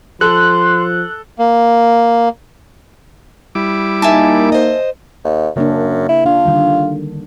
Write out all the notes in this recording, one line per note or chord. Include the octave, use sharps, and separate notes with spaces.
F3 A4 C6 F#6
A#3
G3 E4 D6
A#3 D#4 E5 G#5 A5
C5 D#5
D#2
F#2 C#3 A#3 D4
E4
D4 F4
D3 D#3 G3